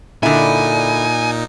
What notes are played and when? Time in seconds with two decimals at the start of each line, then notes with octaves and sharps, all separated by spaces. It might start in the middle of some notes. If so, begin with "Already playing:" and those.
0.23 A#2 D3 D#4 E4 G#5